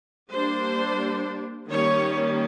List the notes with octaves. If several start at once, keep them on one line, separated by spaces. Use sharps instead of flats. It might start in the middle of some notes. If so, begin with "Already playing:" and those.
G3 A#3 D4 C5
D#3 G3 A#3 C#4 C#5